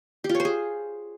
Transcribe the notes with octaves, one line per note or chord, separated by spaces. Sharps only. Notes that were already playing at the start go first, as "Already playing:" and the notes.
G4
F4
C#5
C5
G#4